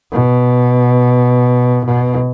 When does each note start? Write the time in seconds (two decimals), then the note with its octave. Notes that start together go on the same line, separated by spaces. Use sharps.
0.12 B2
1.85 B2